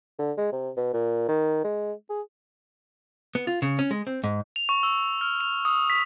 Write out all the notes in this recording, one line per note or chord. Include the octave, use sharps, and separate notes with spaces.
D3
G#3
C3
B2
A#2
D#3
G#3
G#4
B3
F4
C#3
C#4
G#3
C4
G#2
F7
C#6
E6
F6
F7
D#6
B6